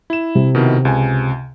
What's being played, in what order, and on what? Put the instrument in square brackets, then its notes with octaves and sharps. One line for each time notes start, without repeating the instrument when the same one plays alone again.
[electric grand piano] E4 E7
[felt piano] C3
[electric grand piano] B2 D#3 E4
C#2 G#5